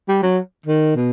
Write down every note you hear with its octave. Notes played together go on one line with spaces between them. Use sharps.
G3
F#3
D#3
B2